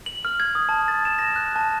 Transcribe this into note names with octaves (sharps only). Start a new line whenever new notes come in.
F#7
F6
G#6
D#6
A5
A6
E7
A#6
F#6
A5